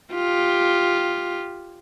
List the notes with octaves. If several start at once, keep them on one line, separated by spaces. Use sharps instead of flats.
F4 G4